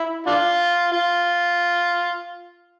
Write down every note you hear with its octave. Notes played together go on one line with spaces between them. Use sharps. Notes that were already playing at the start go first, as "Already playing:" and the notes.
Already playing: E4
D4 F4
F4